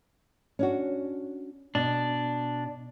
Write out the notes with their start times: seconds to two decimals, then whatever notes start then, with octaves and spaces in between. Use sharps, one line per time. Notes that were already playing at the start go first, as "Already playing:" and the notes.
0.59 C#4 D4 F#4
1.75 B2 D4